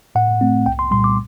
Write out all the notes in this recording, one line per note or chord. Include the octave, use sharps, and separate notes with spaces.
A2 F#5
A3 C4
C2 G5
C6
A#2 G3 C6
D6